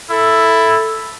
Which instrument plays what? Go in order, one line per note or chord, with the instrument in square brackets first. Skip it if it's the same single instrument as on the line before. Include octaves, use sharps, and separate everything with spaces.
[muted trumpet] E4 [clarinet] A4